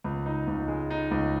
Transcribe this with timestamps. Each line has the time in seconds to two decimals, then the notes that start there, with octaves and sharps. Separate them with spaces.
0.04 C#2
0.26 D#4
0.47 C#2
0.68 G#3
0.90 D#4
1.11 C#2